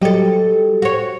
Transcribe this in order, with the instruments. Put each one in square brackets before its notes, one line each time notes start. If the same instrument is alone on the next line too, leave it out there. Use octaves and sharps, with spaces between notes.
[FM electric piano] F#3 G3 G4 [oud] A4 D#5
[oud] F#4 C#5